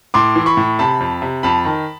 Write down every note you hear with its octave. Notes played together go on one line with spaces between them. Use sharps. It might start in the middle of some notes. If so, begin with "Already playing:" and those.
A2 C6 D6
E3
B5 C#6
A2
C3 A5 B5
F2
C3
F2 A5 B5
D#3